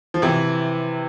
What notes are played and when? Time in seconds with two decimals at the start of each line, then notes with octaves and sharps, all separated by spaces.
0.14 F3
0.22 C3 E3